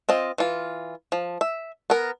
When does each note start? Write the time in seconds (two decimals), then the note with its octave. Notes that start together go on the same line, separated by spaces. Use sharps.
0.09 C4 F4 D#5
0.38 E3 F4
1.12 F3
1.41 E5
1.90 B3 A#4